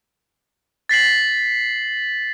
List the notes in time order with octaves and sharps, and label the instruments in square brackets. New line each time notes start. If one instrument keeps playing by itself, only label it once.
[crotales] A6 B6 C7 F#7